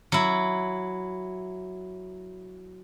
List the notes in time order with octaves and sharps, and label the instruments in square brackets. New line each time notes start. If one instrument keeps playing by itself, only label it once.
[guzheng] F#3 E4